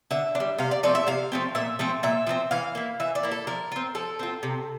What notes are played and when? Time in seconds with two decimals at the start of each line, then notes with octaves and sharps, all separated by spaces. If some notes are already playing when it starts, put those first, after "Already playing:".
0.11 D3 E5
0.35 D4
0.40 G3
0.58 C3 F5
0.71 D5
0.83 F3 A3 C4 D5
0.95 E5
1.07 C3 F5
1.32 F3 A3 C4
1.55 A#2 E5
1.79 F3 A3 C4
2.03 A#2 E5
2.27 F3 A3 C4
2.51 E3 F5
2.75 A#3 E4
3.00 E3 E5
3.15 D5
3.23 A#3 E4
3.31 A4
3.47 F3 A#4
3.72 C4 F4
3.95 F3 A4
4.19 C4 F4
4.43 C3